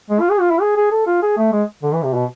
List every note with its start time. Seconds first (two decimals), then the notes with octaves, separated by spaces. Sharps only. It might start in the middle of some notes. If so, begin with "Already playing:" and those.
0.10 G#3
0.20 F4
0.30 G#4
0.40 F4
0.51 E4
0.61 G#4
0.76 G#4
0.91 A4
1.07 F4
1.22 G#4
1.37 A3
1.52 G#3
1.83 D3
1.94 E3
2.04 C3
2.14 B2